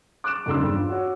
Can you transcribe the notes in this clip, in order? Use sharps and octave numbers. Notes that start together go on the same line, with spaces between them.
D6 F6 F#6 A6 D7 E7
E1 B1 C#3 C6 E6
G2 C4
F4
F#4 C#5